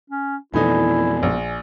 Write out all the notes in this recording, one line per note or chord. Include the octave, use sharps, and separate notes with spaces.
C#4
F2 B2 E3 A3 D#4 E4 D5 G#5
A#1